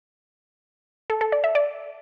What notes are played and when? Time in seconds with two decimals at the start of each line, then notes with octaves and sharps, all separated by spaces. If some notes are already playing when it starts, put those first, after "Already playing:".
1.10 A4
1.21 A4
1.32 D5
1.44 E5
1.55 D5